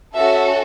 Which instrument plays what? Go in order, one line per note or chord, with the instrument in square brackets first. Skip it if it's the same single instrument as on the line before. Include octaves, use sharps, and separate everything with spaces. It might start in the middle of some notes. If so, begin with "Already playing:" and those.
[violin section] C#4 F#4 A4 E5